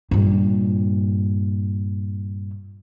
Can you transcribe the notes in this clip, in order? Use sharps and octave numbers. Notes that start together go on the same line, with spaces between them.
G2 A#2